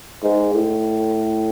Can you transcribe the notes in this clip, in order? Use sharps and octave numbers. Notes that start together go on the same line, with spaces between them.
G#2
A2